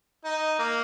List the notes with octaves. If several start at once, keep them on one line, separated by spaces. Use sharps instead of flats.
D#4
A#3